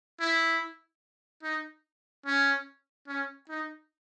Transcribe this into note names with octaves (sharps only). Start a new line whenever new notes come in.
E4
D#4
C#4
C#4
D#4